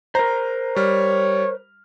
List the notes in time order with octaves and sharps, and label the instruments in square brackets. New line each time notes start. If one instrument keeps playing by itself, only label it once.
[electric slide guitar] A#4 C5 [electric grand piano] A#5
[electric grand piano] G3 F6 [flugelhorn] C#5